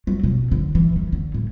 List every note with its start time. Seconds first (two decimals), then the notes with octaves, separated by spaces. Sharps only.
0.07 F#3
0.23 B2
0.51 D3
0.75 E3
0.96 D#3
1.12 D3
1.34 A2